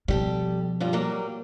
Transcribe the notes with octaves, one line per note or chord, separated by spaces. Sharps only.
B2 F3 G3 G4 A4
G2 G3 F4
F#3 G3 A#3